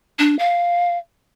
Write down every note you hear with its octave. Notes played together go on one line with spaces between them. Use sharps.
D4
F5